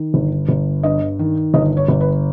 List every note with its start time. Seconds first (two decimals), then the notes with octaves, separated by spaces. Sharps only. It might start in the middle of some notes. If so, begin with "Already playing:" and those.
Already playing: D#3
0.14 G1
0.49 G1
0.83 G2 D#5
1.19 D#3
1.54 G1 D#5
1.77 C#5
1.88 G1
2.01 B4